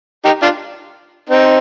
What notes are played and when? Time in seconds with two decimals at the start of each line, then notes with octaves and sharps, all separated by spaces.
0.25 D#4 G4
0.42 D4 F4
1.29 C4 D#4